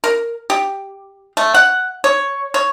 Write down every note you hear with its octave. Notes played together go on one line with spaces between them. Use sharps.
A#4
G4
A3
F#5
C#5
C#5